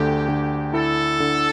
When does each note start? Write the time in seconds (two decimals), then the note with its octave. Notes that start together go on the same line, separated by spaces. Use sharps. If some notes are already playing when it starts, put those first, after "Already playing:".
Already playing: D2 D3 A3 G4
0.28 D3
0.73 E4 A4
1.20 D3